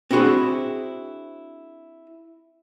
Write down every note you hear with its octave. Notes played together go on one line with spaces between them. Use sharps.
C4 D4 E4 F#4 G#4 C5